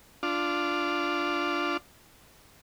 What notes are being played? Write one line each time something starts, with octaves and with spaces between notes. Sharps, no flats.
D4 F4